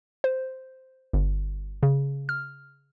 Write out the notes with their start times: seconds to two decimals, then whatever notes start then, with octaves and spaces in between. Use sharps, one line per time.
0.24 C5
1.13 G1
1.83 C#3
2.29 F6